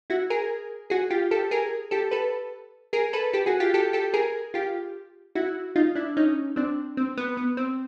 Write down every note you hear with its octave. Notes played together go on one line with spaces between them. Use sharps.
E4 F#4
G#4 A#4
F#4 G#4
F4 G4
G4 A4
G#4 A#4
G4 A4
A4 B4
G#4 A#4
A4 B4
G4 A4
F#4 G#4
F4 G4
G4 A4
G4 A4
G#4 A#4
F4 G4
E4 F#4
D#4 F4
D4 E4
C#4 D#4
C4 D4
C4
B3
B3
C4